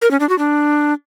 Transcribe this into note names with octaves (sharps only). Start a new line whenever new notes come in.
A#4
C#4
D4
F#4
D4